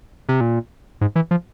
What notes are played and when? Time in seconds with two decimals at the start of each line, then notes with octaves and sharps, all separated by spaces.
0.29 C3
0.41 A#2
1.01 G#2
1.16 E3
1.31 F3